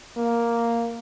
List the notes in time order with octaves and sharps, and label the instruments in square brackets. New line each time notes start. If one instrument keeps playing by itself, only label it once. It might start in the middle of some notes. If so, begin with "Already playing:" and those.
[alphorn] A#3